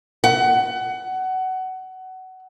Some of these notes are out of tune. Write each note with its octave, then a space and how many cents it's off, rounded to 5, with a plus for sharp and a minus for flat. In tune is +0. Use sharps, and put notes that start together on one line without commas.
F#5 +20